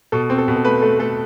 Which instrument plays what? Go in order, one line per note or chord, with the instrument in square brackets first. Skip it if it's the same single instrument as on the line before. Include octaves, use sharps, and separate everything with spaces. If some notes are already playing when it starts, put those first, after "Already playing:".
[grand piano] B2 A4
C4
A4
B2
A4
A3 B4
A3 A4
A3 A4